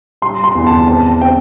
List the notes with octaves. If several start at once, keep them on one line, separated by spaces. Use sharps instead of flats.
G3 C6
C6
E2
A5
C4 A5
C4 G5